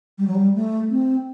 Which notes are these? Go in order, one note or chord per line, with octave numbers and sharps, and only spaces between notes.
G3
F#3
G3
A3
C4